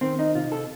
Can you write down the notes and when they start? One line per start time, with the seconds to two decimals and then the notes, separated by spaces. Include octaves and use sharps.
0.01 D#3 C4
0.19 D#4
0.35 C3 F4
0.52 A4